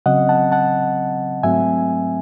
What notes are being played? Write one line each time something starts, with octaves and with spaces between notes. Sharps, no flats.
C#3 F#3 C4 D#5 F#5
F#5 A5
F#5 A5
G#2 F#3 A3 C4 E5 G#5